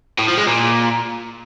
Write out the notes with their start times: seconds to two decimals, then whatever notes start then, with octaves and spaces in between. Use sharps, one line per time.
0.19 A2
0.28 F3
0.37 G#3
0.47 A#2